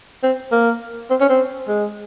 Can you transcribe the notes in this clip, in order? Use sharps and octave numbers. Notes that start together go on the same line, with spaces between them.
C4
A#3
C4
C#4
C4
G#3